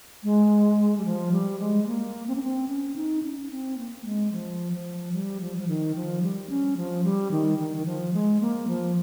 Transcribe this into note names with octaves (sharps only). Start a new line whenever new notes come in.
G#3
G3
F3
G3
G#3
A#3
C4
C#4
C4
C#4
D#4
C#4
C4
A#3
G#3
F3
F3
G3
F3
F3
D#3
F3
G3
C#4
F3
G3
D#3
D#3
D#3
F3
G#3
A#3
F3